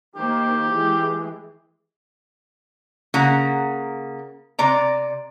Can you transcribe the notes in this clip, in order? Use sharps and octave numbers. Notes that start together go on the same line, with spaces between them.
D#3 A#3 G4 C5
E3 G#3
C#3 A#3 F#5 A#5
C3 D5 A#5